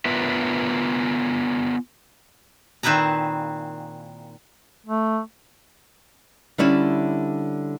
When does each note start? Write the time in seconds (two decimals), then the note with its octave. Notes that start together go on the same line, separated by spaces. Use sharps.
0.05 B3 D4 F4 A#4 B4 E5
2.83 A#2 D#3 C4 E4 B4 A#5
4.86 A3
6.58 D3 G3 C#4 E4